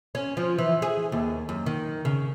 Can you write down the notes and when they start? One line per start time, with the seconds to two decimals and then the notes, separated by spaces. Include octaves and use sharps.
0.15 C#4
0.37 F3
0.59 E3
0.82 G#4
1.12 D#2
1.49 F#2
1.66 D#3
2.05 C#3